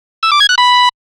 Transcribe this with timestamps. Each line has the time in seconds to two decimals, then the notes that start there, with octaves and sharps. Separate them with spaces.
0.23 E6
0.32 D6
0.40 G#6
0.49 F#6
0.58 B5